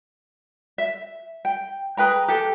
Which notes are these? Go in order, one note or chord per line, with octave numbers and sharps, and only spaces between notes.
E5
G5
G#4 B4 G5 A#5
G4 A4